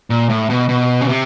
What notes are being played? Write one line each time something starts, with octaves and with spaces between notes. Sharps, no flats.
A#2
A2
B2
B2
C#3
C3